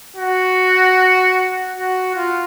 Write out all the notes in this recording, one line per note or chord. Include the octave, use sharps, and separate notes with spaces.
F#4
F#4
F4